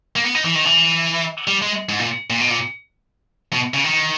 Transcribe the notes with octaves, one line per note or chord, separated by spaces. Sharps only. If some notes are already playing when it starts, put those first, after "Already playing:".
A#3
B3
D#4
E3
D#3
E3
G3
G#3
G#2
A#2
A#2
B2
A#2
B2
C#3
D#3